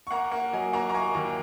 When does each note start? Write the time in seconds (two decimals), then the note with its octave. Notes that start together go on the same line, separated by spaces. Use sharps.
0.07 C#6
0.11 A#3 F#5 A#5
0.31 A#3 F#5
0.53 F#3 D#5 G#5
0.73 A#3 F#5 A#5
0.90 A#5
0.94 A#3 G#5 C#6
1.15 D#2